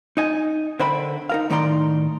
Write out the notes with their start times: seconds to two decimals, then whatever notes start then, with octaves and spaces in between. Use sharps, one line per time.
0.17 D#4 D#5 G#5
0.80 D3 A#4 C5 E5 G5 B5
1.29 D#4 A#4 F5
1.50 A2 D#3 D#4 D5 A#5 C6